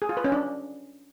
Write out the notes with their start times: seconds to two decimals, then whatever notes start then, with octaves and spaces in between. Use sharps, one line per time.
0.02 G#4
0.09 F4
0.17 B4
0.24 C#4
0.32 D4